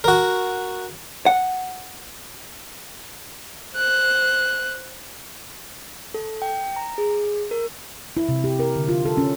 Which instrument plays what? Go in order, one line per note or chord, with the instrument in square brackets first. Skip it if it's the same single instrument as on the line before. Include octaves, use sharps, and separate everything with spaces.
[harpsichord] F#4 A#4
[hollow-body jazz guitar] F#5
[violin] C5 F#6
[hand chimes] A4
G5
A#5
G#4
A#4
[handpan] E4
C3
G4
A#4
D3
F4
A4
C#4